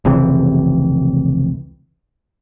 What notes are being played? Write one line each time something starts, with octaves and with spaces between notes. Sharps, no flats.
F1 C#2 C3 E3